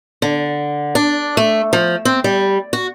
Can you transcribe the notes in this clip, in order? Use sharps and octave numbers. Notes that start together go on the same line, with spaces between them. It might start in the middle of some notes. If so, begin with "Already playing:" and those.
D3
D4
A3
F3
C4
G3
F#4